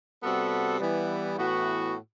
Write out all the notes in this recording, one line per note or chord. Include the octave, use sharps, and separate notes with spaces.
C3 G3 B3 F#4 A4
E3 G3 B3
A2 E3 B3 F#4